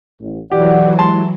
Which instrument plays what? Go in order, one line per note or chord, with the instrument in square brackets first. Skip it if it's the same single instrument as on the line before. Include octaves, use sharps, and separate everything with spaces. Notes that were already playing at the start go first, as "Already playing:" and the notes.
[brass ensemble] A1
[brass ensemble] B1 D5 F#5 [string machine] E3 F#3 [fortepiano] G4
[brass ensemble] G#3 E4 G4 [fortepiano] A5 C6